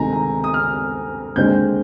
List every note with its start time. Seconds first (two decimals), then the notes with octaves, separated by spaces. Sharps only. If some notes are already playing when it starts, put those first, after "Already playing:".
Already playing: D2 C3 D#3 G#3 G#5 A#5
0.13 A#5
0.44 D#6
0.54 F6
1.36 D#2 D3 G#3 C4 G6